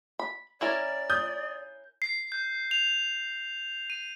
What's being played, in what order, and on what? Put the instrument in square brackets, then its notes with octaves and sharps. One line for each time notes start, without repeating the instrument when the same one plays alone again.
[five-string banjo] B5
[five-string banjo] C#4 E4 A#4 [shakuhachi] D5
[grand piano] D#6 G6
[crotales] C7
G6
F7
D#7